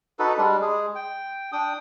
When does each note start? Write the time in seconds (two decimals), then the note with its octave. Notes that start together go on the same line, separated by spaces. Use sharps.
0.19 D#4 F#4 A4 B4
0.38 G3 G#3 D4
0.62 G#3 G#4
0.95 G5
1.52 D4 G5 D#6